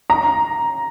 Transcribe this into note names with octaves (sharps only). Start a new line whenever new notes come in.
A#5